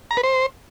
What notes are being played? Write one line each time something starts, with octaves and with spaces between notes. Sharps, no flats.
A#5
B4
C5